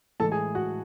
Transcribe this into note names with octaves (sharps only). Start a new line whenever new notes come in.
A2 E3 G#3 A4 A5
G#4 G#5
F#4 F#5